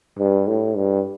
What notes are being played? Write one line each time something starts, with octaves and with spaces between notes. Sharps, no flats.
G2
A2
G2